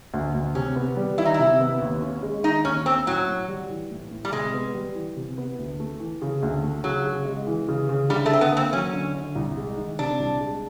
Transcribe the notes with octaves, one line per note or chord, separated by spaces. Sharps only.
D2
D2
C3 C#4
B3
G3
D#3 E4
D#4
C3 E4
B3
D#2
C#4
G#3
D#3 D#4
D#2 C#4
C4 C#4
A2 F#3
A2
G3
E3
A2
A2
G3
C3 G#3
B3
G3
E3
C3
B3
D2
A3
E3
C#3
D2
A3
C#3 F#3
C#3
G#3
E3
C#3
C#3
D3 G3
A3
D3 C4
B3
A#3
C4
F#3 C#4
D3
D3
C2
G#3
D#3
C3 D4
C2
G#3